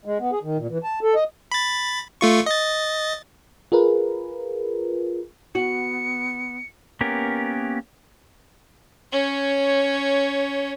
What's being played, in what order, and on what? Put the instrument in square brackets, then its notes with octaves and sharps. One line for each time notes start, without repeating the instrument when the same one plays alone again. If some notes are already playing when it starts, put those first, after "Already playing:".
[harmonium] G#3
B3
G#4
D#3
A#2
E3
A5
A4
D#5
[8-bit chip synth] B5 A6
A3 F4 C#6
D#5 A6
[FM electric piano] F4 G#4 A#4 B4
[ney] B3 [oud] F#4 [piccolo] C#7
[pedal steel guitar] A#3 B3 C#4 G4 A#4
[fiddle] C#4 C#5